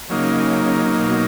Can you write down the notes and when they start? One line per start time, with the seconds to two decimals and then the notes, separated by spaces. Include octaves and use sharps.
0.10 C#3 F#3 A#3 D#4
0.92 B2